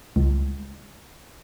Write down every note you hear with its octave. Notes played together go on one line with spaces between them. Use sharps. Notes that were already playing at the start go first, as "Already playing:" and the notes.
C#2